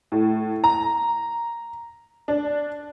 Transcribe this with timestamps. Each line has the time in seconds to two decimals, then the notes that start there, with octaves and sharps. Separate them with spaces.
0.12 A2
0.64 A#5
2.28 D4